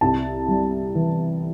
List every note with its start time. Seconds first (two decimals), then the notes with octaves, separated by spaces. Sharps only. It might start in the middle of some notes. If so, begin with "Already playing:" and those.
0.01 C2 A5
0.48 G3
0.95 E3